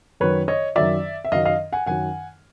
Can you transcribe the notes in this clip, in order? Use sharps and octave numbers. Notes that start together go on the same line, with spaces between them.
F#2 D#3 F#3 B4 C#5
C#5 D#5
F#2 D#3 F#3 D5 E5
E5
F#2 D#3 F#3 D#5 F5
D#5 F5
F#5 G#5
F#2 D#3 F#3 F#5 G#5